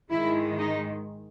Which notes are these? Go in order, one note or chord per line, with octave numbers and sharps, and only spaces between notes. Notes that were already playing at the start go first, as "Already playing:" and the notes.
G#2 D#3 G#3 E4
D#4